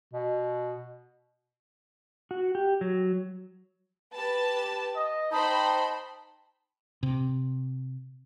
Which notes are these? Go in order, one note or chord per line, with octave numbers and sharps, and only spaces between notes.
B2
F#4
G4
F#3
G4 B4 A5
D#5
D#4 C5 G5 A5 B5
C3